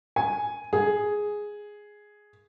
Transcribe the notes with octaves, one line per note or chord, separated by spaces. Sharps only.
G#5
G#4